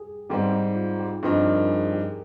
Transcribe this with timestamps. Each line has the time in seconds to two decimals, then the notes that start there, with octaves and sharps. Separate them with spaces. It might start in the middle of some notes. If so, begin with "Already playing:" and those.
Already playing: G4 G#4
0.30 G#2 G3 C4 G4
0.53 D#4
0.76 F4
0.99 G4
1.23 G2 F3 C4 D#4 G#4
1.46 A#4
1.69 G#4
1.93 G4